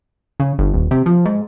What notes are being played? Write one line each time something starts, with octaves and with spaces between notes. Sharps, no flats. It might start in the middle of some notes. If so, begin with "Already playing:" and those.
C#3
G1
D#1
C3
F3
G#2